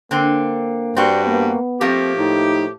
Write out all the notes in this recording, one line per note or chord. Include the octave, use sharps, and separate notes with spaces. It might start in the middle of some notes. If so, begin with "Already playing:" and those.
D3 A#3 C4
G2 C4 F#4 D5
A#3 B3
F3 A3 A#3 C4 G4
A2 D#4